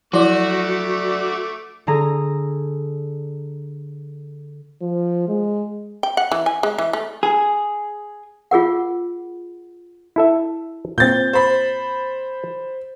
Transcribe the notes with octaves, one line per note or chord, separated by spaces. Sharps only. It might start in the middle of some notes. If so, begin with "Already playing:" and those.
F3 F#3 A3 E4 F#4 D5 D6
D3 G#4 A#5
F3
G#3
G5
F#5
E3
G#5
G#3
E3
A3
G#4
F4 G#4 A#4 F#5
E4 A4 E5
A#2 C4 G6 A6
C5 B5